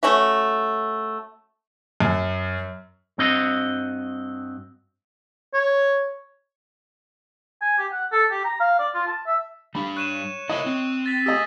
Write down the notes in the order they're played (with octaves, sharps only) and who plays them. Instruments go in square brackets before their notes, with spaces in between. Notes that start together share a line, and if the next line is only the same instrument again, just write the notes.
[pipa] A3 C#4 F#4 E5
[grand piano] F#2
[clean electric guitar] G2 C4 F#4 D#5
[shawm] C#5
[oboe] G#5
G4
F#5
A4
G4
A#5
F5
D5
F4
A5
E5
[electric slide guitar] G3 D4 [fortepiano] B5
[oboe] C#5 [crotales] F#6 D#7 E7
[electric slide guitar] E4 A#4 E5 [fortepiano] D#5
[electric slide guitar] C4
[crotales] A6 B6
[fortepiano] G4 D#5 [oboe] G#4 [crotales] E6 A#6